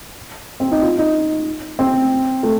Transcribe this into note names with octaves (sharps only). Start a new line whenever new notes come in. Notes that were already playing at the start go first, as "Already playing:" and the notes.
C4
D#4
F4
D#4
C4
A3